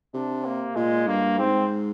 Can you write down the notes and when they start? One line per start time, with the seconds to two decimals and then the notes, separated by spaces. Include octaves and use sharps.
0.14 C3 D4
0.45 A#3
0.75 A#2 G#3
1.07 G2 A#3
1.38 G#2 C4